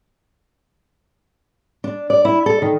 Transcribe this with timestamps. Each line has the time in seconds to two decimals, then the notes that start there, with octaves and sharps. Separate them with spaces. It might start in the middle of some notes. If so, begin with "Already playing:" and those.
1.84 D4
2.10 D5
2.25 E4
2.46 A4
2.62 D#3